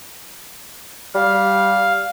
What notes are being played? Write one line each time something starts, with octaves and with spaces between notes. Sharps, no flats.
G3 F5